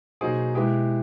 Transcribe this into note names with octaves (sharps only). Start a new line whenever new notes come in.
B2 F#3 A#3 D#4 G#4 C5
B2 G#3 B3 E4 G4